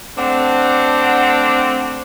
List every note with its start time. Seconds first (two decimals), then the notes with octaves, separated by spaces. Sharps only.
0.17 A3 C4 D4 F#5